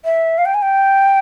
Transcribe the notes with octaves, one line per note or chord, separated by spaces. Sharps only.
E5
F5
G5
G#5
G5